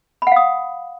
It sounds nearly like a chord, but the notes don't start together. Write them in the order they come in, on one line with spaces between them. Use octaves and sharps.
B5 F#5 F5 D#6